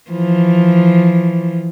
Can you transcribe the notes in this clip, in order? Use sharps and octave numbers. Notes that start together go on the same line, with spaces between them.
E3 F3